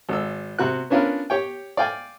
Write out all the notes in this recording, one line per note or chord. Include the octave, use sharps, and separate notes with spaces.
G#1 E6
C3 F#4 F#6
B3 C#4 D4 F4 A#4 B4
G4 C#5 G5
D5 F5 G5 G#5